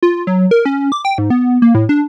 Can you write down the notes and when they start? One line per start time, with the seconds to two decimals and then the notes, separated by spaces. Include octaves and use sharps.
0.03 F4
0.27 F#3
0.51 A#4
0.65 C#4
0.92 D6
1.05 G5
1.18 G#2
1.30 B3
1.62 A#3
1.75 A2
1.89 D4